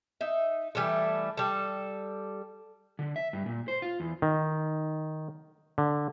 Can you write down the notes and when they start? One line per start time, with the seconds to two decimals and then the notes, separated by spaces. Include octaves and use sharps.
0.21 D#4 E5
0.75 E3 G3 A3 A4
1.37 G3 A4
2.99 D3
3.16 E5
3.33 G2
3.46 A#2
3.68 C5
3.82 F4
4.00 E2
4.22 D#3
5.78 D3